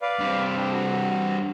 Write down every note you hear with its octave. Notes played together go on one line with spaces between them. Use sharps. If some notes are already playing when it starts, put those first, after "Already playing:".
B4 D5 F5
G2 C4
D4 G4
F#4